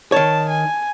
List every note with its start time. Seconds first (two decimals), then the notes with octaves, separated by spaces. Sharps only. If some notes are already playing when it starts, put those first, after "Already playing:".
0.12 D#3 C#5 A5
0.50 G#5